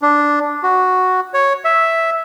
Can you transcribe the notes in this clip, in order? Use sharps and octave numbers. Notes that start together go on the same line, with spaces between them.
D4
F#4
C#5
E5